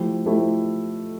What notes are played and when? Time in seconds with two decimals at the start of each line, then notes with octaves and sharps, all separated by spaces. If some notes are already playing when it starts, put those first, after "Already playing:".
Already playing: F3 A3 E4 G4
0.26 F3 A3 E4 G4